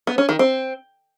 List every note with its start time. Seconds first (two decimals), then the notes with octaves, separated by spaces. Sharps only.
0.07 B3
0.18 C#4
0.29 D#3
0.39 C4